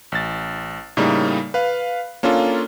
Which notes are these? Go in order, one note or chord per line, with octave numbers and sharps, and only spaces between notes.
A1 A6
A2 C#3 G3 A#3 D#4
B4 F5
A#3 C#4 D4 F4 A4